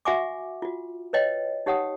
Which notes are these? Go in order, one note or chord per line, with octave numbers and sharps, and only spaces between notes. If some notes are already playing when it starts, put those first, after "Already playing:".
F#4 E5 F#5 G#5 C#6 D6
F4 F#4
B4 C#5 D#5 G5
D#4 G4 C#5 F#5 G5 D#6